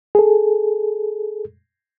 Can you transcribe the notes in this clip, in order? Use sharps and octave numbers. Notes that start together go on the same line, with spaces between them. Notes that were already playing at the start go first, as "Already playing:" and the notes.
G#4 A4